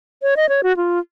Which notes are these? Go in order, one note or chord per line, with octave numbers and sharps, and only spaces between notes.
C#5
D#5
C#5
F#4
F4